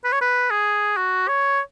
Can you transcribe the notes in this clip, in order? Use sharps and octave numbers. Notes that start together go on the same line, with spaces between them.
B4
C#5
B4
G#4
F#4
C#5